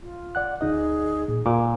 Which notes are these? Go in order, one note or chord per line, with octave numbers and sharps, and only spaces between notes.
F4
D5 F#5 F#6
D2 D#4 G#4 D#5
A#2 G#4
A#2 D6